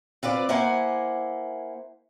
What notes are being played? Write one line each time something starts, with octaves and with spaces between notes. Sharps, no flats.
C4 F4 B4 D5
A#3 E4 C5 F#5 G#5